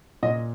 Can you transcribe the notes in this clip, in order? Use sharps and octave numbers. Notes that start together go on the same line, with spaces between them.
A#2 D#5